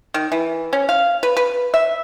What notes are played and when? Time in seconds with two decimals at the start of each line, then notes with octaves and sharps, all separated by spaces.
0.14 D#3
0.32 E3
0.73 C#4
0.89 F5
1.23 B4
1.37 B4
1.74 E5